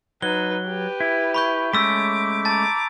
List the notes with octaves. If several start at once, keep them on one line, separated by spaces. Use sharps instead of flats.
F#3 D#4 B4 G7
G4 B4
E4
B5 C#6 G6
G#3 A3 C#4 D6 E6 B6
A5 A#5 D6 A6